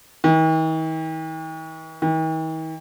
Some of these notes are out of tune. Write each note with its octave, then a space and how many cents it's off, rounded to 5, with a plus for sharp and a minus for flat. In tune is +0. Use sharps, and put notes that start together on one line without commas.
D#3 +45
D#3 +45